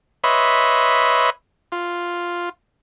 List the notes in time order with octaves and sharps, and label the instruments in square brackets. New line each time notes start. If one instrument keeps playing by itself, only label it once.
[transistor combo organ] B4 C#5 D#5 E5 B5 C6
F4